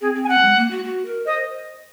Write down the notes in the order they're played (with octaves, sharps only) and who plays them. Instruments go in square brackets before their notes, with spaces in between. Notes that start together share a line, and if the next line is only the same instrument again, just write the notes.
[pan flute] C4 [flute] G#4
[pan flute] C4
[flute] G#5
[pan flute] C4 [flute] F#5
[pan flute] F#3
G#3
A#3
F#4
F#4
A#4
[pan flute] C5 [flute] D#5